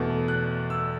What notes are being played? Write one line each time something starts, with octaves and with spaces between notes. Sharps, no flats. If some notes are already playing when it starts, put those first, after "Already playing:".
Already playing: E2 B2 A3
F#6
E6